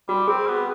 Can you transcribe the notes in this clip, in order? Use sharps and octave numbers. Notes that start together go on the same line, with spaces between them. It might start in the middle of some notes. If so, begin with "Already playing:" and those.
G3 F#4
C4 G#4
B3